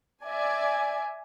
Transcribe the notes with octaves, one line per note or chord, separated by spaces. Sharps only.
D5 E5 G#5